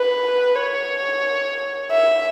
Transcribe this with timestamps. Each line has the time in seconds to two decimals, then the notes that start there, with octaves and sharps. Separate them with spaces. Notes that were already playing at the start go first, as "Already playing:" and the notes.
Already playing: B4
0.55 C#5
1.91 E5